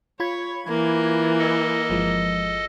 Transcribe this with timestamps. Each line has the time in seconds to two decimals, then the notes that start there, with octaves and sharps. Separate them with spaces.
0.20 F4 C#5 B5 G#6
0.68 E3 A#3
1.39 A4 D#5
1.90 G1 F3 G#3